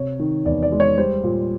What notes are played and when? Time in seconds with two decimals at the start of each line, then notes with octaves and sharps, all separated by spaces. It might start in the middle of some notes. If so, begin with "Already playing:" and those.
Already playing: C3 C#5
0.20 D#3
0.45 E2 D5
0.63 D5
0.72 G#3
0.80 C#5
0.98 G3 C5
1.24 A#2